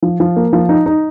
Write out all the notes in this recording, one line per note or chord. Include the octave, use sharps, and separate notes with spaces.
F3
F3
A#3
F3
D#4
D#4